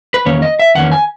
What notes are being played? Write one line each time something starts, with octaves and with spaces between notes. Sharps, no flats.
B4
E2 D#3 A#3 C#4 C#5
D#5
E5
E2 D#3 A#3 C#4 F#5
G#5